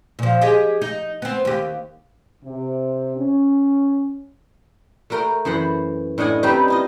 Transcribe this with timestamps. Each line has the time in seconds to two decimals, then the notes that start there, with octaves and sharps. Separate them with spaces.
0.19 A#2 F3
0.41 G4 G#4 D#5
0.82 D#4
1.22 B3 C4
1.45 D#2 G4
2.44 C3
3.17 C#4
5.10 A3 F#4 A#4 G5 A#5
5.45 F#2 E3 C5 F#5 B5
6.18 A2 D4 D#5 F#5 G#5
6.43 G3 C4 C#4 D#4 G4 B4
6.68 E4 F4 D#5